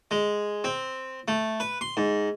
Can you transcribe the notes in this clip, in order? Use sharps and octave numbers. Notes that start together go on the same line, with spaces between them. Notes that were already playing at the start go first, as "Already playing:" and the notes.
G#3
C4
A3
B4
C6
G#2